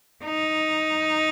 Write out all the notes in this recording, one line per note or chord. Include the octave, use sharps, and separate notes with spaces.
D#4